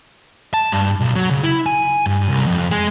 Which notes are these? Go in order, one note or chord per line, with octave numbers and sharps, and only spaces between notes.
A5
G2
B1
F#3
C#3
E4
G#5
G2
C2
F2
G#3